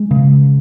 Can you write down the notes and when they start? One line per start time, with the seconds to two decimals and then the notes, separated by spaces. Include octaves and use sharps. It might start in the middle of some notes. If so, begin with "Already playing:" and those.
Already playing: G#3
0.11 C#3